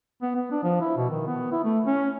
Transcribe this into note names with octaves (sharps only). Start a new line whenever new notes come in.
B3
B3
D4
F3
E4
B2
D#3
B3
E4
A3
C#4